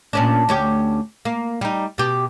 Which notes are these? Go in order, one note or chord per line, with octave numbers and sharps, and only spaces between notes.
A#2 C#4 D4
D2 C#4 G4
A#3
G3 D#4
B2 G4